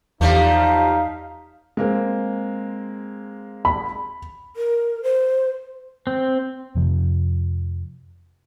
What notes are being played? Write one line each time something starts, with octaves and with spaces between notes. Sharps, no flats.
E2 F3 G3 A3 D#4 F5
G#3 A#3 C4
B5
A#4
C5
C4
F2 C3 F3